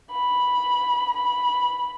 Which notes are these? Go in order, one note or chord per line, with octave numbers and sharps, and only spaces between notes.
B5
B5